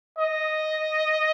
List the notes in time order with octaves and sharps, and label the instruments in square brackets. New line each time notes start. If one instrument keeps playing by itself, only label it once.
[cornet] D#5